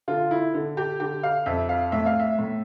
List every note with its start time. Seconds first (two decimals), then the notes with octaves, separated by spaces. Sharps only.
0.08 D3 F4
0.31 E4
0.54 D3
0.77 G4
1.00 D3 G4
1.23 F5
1.46 F2 E5
1.69 F5
1.92 A2 E5
2.06 F5
2.20 E5
2.39 A2